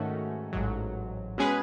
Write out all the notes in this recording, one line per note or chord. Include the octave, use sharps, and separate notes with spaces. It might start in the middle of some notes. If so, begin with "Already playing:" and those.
Already playing: G#2 D#3 A3 C#4 F#4
A1 G#2 F#3
B2 G#3 C#4 G#4 B4